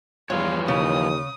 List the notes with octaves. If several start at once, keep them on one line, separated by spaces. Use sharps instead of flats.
E2 G2 E3 F3 F4 C#5
D#2 C#3 D#6